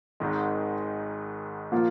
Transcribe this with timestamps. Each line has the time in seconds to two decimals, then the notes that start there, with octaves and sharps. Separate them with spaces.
0.20 G#1 G#2 D#3 G#3
1.72 A#2 F3 A#3 F4